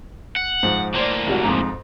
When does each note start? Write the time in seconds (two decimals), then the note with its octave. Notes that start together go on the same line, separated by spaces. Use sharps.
0.36 F#5
0.63 G#2 F3
0.95 A2 A#3 C5 D5
1.27 G#1 G3 F#4
1.43 F2 G#2 A#5